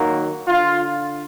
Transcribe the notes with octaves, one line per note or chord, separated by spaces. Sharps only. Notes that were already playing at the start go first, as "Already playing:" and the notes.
Already playing: D#3 F#3 A#3
D3 F4